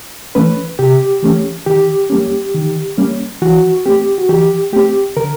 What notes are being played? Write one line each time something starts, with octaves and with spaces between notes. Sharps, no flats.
E3 A3 C#4 B4
C3 G4
E3 A3 C#4
D#3 G4
G3 A#3 C#4
D#3
G3 A#3 C#4
E3 F#4
A3 C4 G4
F#4
E3 G4
A3 C4 G4
D3 A#4